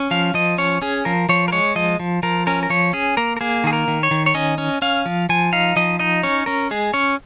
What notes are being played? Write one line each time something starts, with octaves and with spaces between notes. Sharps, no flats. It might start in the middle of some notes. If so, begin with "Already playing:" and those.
Already playing: C#4
F3 F5
F3 D#5
C#4 C#5
C#4 G#4
F3 A#4
F3 C#5
A#4
G#3 C#5
F3 D#5
F3
F3 A#4
C#4 A#4
A#4
F3 C#5
C#4 G#4
A#3 A#4
A#4
A#3 G#4
D#3 G#4
A#4
D#3
C#5
D#3
C#5
C#4 D#5
C#4
C#4 F5
F3
F3 G#5
D#4 F5
F3 D#5
D#4 D#5
C#4 C#5
C#4 A#4
G#3 G#4
C#4 C#5